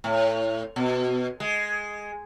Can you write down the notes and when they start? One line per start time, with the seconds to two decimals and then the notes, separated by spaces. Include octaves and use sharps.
0.04 A2
0.76 B2
1.40 G#3